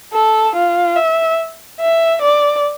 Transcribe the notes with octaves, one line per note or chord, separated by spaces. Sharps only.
A4
F4
E5
E5
D5